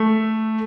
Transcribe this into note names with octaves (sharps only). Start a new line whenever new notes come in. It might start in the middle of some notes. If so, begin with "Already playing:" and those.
Already playing: A3